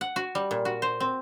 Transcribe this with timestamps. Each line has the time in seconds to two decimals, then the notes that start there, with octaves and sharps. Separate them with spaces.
0.01 F#5
0.16 F#4
0.35 G3
0.51 A#2
0.65 F#4
0.82 C5
1.00 C4